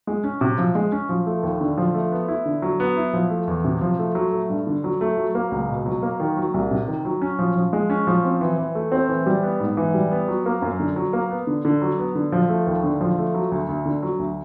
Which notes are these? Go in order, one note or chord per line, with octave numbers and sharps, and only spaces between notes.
G#3
C#4
C3
F3
G#3
C#4
F3
A3
D#2
D3
F3
A3
B3
E4
D3
F#3
B3
E4
F3
A3
E2
C3
F3
A3
F#3
A3
G2
D3
F#3
A3
F#3
A#3
C#2
B2
F#3
A#3
D#3
F#3
C2
C3
D#3
F#3
C#4
F3
F3
G#3
C#4
F3
C4
E3
E3
A3
C4
E3
G3
B3
G#2
E3
G3
B3
F#3
A#3
F#2
D3
F#3
A#3
B3
D3
D3
F#3
B3
D3
F3
A3
D#2
D3
F3
A3
F#3
D2
D2
D3
F#3
D2